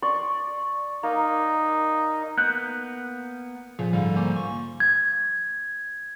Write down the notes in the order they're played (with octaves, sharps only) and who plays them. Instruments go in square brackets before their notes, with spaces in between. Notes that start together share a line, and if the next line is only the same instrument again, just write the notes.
[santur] D5 C6 C#6
[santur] A#3 [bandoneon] D#4
[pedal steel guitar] A#3 B3 F#6 G6
[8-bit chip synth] A#2 [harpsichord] C#3 [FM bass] F3
[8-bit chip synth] G#2 D3 G3 [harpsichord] F5
[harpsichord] A#3 C#4 C5
[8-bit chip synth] C#6
[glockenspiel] G#6